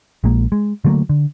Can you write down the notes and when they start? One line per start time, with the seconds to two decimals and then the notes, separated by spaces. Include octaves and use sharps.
0.24 A#1 G#3 A#3
0.52 G#3
0.85 D3 F#3 A3 A#3
1.09 D3